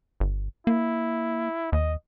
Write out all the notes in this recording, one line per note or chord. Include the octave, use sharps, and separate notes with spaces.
G1
A#3 E4
D#2 D#5